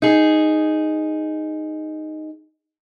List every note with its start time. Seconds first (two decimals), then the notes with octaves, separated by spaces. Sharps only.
0.02 D#4 G#4